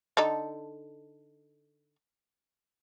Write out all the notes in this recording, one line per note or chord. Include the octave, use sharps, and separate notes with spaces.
D3 D#4 A4